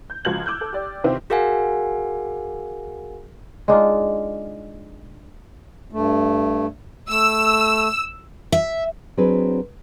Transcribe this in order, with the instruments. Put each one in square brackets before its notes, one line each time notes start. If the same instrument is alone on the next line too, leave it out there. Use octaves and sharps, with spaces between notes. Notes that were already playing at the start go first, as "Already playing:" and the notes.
[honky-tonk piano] G6
C#2 F3 F#4 F6 G#6 F#7
D6 E6 F#6 G6
A4
G4 D5
C3 D#3 E3 C4 F4 G4
[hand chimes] F#4 G#4 A#4 F5 F#5 G#5
[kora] G#3 D4 D#4 F4
[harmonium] G2 A3
[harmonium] A3 [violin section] E6
[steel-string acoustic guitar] E5
[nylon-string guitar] F#3 C4 D4 G#4 B4